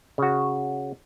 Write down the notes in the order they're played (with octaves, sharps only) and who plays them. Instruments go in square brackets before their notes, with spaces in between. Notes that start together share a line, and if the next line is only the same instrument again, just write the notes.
[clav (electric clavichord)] C#3 F#4